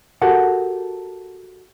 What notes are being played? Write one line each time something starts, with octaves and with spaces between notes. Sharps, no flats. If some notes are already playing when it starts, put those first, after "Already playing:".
F#4 G4 A4 A#4 F#5